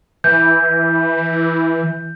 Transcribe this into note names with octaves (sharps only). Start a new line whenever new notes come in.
E3 G6